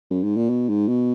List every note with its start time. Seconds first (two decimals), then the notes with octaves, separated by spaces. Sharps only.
0.11 F#2
0.23 G#2
0.37 A#2
0.50 B2
0.69 G#2
0.88 B2